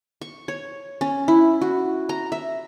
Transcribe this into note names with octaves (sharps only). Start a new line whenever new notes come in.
C#6
C#5
C#4
E4
F#4
A#5
E5